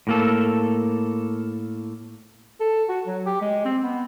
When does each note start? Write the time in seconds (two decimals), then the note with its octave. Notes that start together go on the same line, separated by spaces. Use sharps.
0.07 A2 A#3 A4
2.60 A4
2.89 F#4
3.07 F#3
3.26 G4
3.41 G#3
3.65 C4
3.83 B3